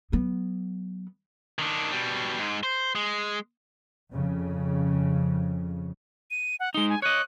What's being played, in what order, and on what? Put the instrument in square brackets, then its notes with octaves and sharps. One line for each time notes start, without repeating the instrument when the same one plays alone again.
[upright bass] F#3 B3
[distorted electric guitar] D#3 D4
B2 G3
G#2 G#3
C5
G#3
[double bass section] F2 C#3
[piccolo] D#7
F#5
[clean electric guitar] G#3 D#4 [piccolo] G7
[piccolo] G#5
[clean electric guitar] C#5 D#5 [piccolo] F#6